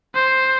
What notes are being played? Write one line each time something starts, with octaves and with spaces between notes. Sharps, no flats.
C5